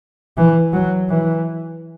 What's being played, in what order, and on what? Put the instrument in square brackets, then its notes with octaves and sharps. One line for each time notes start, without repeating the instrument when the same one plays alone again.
[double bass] E3
F#3
E3